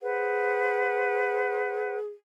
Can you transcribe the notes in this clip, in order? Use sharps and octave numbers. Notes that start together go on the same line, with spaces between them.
G#4 B4 C5 F#5